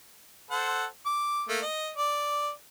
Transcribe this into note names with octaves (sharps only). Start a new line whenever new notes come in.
A4 C5 F#5
D6
A3 A#3
D#5
D5